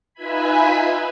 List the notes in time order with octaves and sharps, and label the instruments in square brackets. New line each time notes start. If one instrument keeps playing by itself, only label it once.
[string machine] D#4 F4 B4 E5 G#5 B5